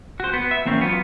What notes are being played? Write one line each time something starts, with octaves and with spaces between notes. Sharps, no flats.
F#4 C5
B3
E5
E2 A#3 C4 C#4
F#3 B3 C4 F4